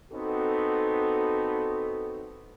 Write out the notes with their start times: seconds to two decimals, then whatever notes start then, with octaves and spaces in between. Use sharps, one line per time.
0.13 B3 C4 D#4 F#4 A4